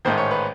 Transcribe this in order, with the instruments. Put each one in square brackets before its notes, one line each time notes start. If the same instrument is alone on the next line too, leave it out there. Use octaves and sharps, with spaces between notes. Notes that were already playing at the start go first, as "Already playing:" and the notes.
[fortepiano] A1 G#2 D#3 C5
C#5
B4